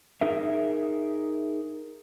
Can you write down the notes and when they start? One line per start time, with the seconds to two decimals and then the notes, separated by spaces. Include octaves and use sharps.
0.21 D#4 G#4 A#4 E5